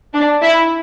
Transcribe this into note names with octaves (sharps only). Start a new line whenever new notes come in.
D4
E4